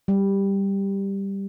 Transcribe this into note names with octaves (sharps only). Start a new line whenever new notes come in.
G3